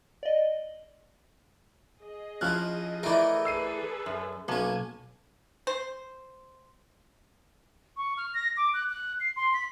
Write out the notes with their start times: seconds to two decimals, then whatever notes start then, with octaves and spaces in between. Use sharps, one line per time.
0.23 D5 D#5
2.00 G#4 D#5
2.41 F3 C#4 E4 F6 F#6
3.03 E3 A3 A#4 D5
3.45 G#4 A4 B4 E6 C7 D#7
4.06 F#2
4.48 B1 A#3 C#4 G#5 A5
5.67 C5
7.97 C#6
8.17 F6
8.34 A#6
8.57 D6
8.74 F#6
8.89 F#6
9.20 C7
9.36 C6
9.54 B6